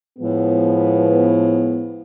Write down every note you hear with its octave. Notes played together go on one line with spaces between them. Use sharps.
A2 F3 G#3 B3